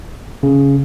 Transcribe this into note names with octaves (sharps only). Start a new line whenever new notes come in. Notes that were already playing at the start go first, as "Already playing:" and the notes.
C#3